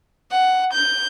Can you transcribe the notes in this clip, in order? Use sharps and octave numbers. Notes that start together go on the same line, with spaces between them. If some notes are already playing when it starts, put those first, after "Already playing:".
F#5
G6